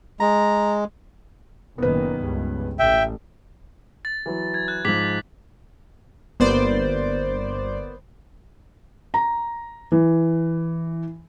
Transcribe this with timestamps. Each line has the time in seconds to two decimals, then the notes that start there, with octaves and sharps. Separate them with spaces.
0.20 G#3 A#5
1.78 F#1 A#2 D#3 B3 B4
2.19 C#2 G2
2.79 A1 E5 G5
4.05 A6
4.26 E3 F#3
4.54 G#6
4.68 F#6
4.85 G#2 F3 D6 B6 F#7
6.40 G1 A#3 B3 C5 D5
9.14 A#5
9.92 E3